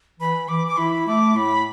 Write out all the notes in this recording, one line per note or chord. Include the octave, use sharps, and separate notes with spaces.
E3 B5
E3 D6
D6
E4 B5
A3 D6
A2 B5